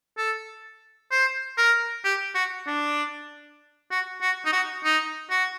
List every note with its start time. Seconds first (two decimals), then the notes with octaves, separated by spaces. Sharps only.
0.18 A4
1.12 C5
1.58 A#4
2.05 G4
2.35 F#4
2.67 D4
3.91 F#4
4.22 F#4
4.46 D#4
4.52 F#4
4.84 D#4
5.31 F#4